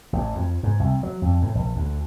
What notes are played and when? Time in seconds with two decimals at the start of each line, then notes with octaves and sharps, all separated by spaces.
0.13 A1
0.35 F2
0.63 G#2
0.80 C2
1.03 F#3
1.22 F2
1.42 A2
1.55 A#1
1.76 D2